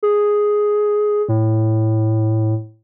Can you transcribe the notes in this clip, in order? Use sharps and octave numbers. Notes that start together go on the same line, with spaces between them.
G#4
A2